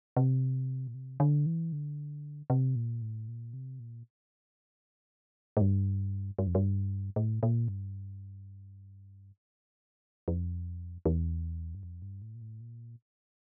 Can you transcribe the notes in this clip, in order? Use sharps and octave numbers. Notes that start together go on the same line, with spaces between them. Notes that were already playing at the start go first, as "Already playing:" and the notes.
C3
A#2
C3
D3
E3
D3
C3
A#2
A2
A#2
C3
A#2
A2
G2
G2
F2
G2
A2
A#2
G2
F2
E2
G2
F2
G2
A2
A#2
A2
A#2